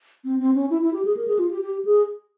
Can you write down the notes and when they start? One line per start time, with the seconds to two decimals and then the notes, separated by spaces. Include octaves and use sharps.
0.25 C4
0.40 C4
0.55 C#4
0.70 E4
0.82 E4
0.93 G4
1.05 G#4
1.17 A#4
1.28 G#4
1.39 F4
1.51 G4
1.62 G4
1.85 G#4